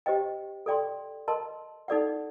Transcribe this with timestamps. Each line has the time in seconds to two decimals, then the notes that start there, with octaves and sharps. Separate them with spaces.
0.06 G4 C5 D#5 G5
0.66 A4 D5 G5 C6
1.28 A#4 D#5 A5 C6
1.88 D#4 A4 D5 F#5